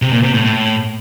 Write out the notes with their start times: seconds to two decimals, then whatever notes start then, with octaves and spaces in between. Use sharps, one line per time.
0.02 C3
0.13 A#2
0.23 C3
0.34 A2
0.44 A2